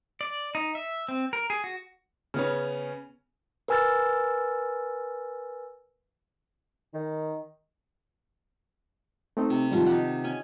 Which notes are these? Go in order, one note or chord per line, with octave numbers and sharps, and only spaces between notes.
D5
D#4
E5
C4
A#4
G#4
F#4
C#3 B3 C#4
A#4 B4 G#5 E6 F6 A6
D#3
A3 C4 D#4
C3
G#2 D#3 F3 G3 A5
D#4 G4 F#5
C#4 G#5